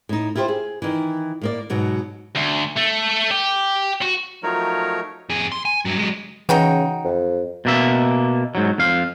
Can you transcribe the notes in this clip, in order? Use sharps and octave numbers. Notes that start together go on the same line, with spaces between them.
A2 D#4
E4 F4 G4 A#4 C5
G#4
D#3 E3
A2 A#3 D5
G#2 B2 F#3
D2
A3
G4
F#4
F3 F#3 A3 D#4 A#4 C#5
F2 G#4
C6
G#5
G2 F#3
F#3 G#3
C#3 E3 D#4 F#4 G5
F2
B2 A#3 E5
G#2 F#3
F2 F5